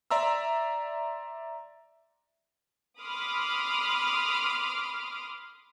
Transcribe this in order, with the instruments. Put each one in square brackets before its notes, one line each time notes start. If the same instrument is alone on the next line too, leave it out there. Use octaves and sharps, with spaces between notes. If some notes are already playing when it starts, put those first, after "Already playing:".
[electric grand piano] D5 E5 A#5 C6 E6
[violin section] B5 C6 D6 D#6 F6